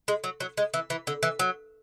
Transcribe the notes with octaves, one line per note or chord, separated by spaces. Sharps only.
G#3
F#3
F#3
G#3
E3
E3
D3
E3
F#3